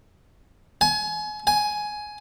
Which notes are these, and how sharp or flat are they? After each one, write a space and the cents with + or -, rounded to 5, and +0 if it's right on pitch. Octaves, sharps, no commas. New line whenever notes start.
G#5 +30
G#5 +10